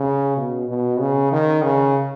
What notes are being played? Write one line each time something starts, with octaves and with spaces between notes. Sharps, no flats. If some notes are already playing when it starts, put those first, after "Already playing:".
Already playing: C#3
B2
B2
C#3
D#3
C#3